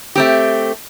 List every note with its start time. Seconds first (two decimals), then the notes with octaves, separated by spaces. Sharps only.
0.16 A3 C4 G4